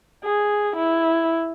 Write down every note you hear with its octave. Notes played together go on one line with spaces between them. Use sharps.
G#4
E4